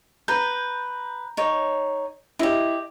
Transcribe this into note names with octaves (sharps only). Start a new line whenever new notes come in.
B4 A#5 G6
D#4 C#5
E4 G4 D#5 E5